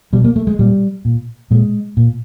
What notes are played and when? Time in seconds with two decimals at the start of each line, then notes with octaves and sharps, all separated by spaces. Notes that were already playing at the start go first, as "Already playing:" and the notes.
0.13 B2 G3
0.24 A#3
0.36 A3
0.47 G#3
0.59 A#2 G3
1.05 A#2
1.51 A#2 G#3
1.97 A#2